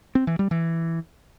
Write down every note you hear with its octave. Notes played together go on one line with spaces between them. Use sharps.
C4
E3
G3
E3